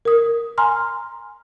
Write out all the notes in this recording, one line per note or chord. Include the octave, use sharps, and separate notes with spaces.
A#4 D#6
G#5 A#5 C6 F6